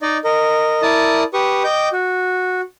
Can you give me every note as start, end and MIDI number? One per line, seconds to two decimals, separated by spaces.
0.02 0.18 63
0.02 0.18 74
0.02 0.18 75
0.25 0.82 70
0.25 0.82 75
0.82 1.23 64
0.82 1.23 70
0.82 1.23 74
0.82 1.23 81
0.82 1.23 87
1.34 1.63 67
1.34 1.63 71
1.34 1.63 85
1.34 1.63 87
1.64 1.89 75
1.64 1.89 79
1.64 1.89 86
1.64 1.89 91
1.93 2.61 66